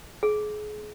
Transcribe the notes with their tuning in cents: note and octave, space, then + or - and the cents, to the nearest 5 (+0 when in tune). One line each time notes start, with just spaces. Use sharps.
G#4 +30